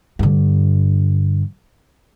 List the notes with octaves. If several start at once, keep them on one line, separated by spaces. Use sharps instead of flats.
G2 D3